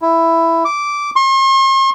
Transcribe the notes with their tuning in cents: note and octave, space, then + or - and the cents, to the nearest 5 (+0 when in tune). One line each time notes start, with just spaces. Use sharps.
E4 +5
D6 -10
C6 +45